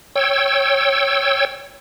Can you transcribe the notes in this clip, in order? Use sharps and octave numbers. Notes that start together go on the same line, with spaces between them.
C#5 G5 E6